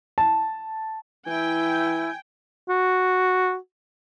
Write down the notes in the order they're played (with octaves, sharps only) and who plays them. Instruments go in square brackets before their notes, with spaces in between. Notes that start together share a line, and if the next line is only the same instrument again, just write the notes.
[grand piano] A5
[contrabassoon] E3 [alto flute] E4 [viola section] G5 [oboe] G#5
[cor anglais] F#4